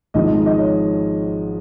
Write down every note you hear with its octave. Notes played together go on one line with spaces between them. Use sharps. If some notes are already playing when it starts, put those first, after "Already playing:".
G#1 G#2 F3 D#5
D#5
C#5